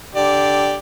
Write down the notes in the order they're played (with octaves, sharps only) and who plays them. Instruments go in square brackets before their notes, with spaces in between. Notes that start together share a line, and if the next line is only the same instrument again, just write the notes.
[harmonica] D3 G4 D5